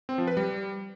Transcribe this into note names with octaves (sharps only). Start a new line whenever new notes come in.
C4
F3
B4
G3